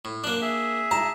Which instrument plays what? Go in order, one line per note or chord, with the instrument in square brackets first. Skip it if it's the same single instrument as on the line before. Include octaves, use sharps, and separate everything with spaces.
[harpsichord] A2
[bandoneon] F#2 F#6 [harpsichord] A#3 D4
[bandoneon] G#4 E5
[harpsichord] A5 [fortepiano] A#5